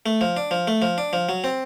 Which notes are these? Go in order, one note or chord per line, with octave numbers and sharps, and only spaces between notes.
A3
F3
D4
F3
A3
F3
D4
F3
F#3
C4